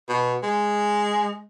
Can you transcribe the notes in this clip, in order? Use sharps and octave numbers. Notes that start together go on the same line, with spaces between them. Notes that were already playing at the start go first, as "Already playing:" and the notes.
B2
G#3